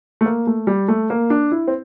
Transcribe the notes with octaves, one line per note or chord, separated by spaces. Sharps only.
A3
A#3
A3
G3
A3
A#3
D4
E4
C4